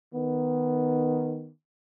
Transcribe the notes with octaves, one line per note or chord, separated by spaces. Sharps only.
D#3 B3